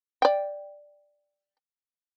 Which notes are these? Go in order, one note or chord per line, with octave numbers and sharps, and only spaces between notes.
D5 G5